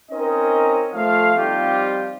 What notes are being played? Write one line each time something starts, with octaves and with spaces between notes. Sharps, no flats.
C4 C#4 D#4 A#4 D#5
F3 A3 F5
F3 G3 C4 D#4 F4 G4